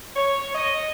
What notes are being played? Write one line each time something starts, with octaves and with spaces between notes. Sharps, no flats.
C#5
D#5